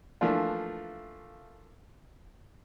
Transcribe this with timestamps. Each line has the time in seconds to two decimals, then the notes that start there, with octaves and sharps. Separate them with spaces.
0.21 E3 F3 A3 A#3 D4 F4